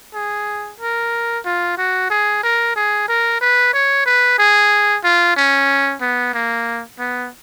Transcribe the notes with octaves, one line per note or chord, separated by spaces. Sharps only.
G#4
A#4
F4
F#4
G#4
A#4
G#4
A#4
B4
C#5
B4
G#4
F4
C#4
B3
A#3
B3